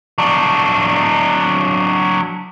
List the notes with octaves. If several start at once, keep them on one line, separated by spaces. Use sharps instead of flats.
F#3 D4